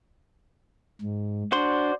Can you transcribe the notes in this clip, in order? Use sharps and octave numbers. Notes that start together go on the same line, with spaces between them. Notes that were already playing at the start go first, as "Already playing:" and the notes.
G#2
D4 F#4 C5 D5 C6